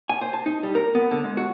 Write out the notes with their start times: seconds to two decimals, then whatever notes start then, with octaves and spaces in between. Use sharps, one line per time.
0.09 G#5
0.21 C5
0.33 A5
0.46 D#4
0.63 G3
0.75 A#4
0.95 B3
1.11 D3
1.24 G#3
1.37 F#4